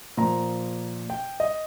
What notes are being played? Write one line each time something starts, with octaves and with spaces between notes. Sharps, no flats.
A#2 F3 A#5
G5
D#5